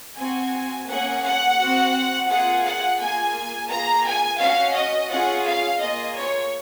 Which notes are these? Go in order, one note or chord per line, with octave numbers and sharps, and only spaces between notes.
C4 F#4 G#5
A#3 C#4 G#4 F#5
F#5
C4 F#4
A#3 F4 G#4 F#5
F#5
A#3 F4 G#4 G#5
A#3 F4 G#4 A#5
G#5
C#4 F#4 F5
D#5
C#4 F4 G#4 F#5
F5
A#3 F4 G#4 D#5
C#5